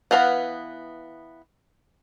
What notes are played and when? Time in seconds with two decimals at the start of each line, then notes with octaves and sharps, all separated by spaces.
0.11 E3 F#3 B3 F5 F#5